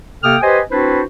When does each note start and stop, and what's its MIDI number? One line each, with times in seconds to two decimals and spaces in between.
0.24 0.37 48
0.24 0.37 58
0.24 0.37 69
0.24 0.37 79
0.24 0.37 87
0.24 0.37 89
0.42 0.60 67
0.42 0.60 71
0.42 0.60 72
0.42 0.60 75
0.42 0.60 80
0.71 1.02 60
0.71 1.02 62
0.71 1.02 64
0.71 1.02 66
0.71 1.02 71
0.71 1.02 72